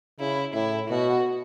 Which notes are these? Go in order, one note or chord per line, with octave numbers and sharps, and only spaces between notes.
C#3 E4
A2 E4
B2 F#4